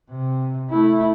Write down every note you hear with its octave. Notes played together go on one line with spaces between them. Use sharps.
C3
A3 E4